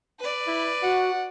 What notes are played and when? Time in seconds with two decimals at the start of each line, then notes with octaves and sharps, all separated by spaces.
0.19 B4 D5
0.47 E4
0.83 F#4 F#5